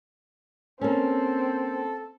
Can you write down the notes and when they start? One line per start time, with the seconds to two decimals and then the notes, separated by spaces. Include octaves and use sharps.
0.81 A#3 C4 C#4 A4